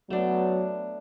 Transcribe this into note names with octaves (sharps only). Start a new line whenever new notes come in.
F#3 A3 B3 D4